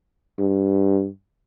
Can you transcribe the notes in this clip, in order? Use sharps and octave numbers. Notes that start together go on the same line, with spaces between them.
G2